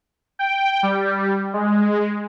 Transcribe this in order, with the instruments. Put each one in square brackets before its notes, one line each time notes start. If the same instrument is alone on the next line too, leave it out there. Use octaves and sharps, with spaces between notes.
[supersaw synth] G5
G3
G#3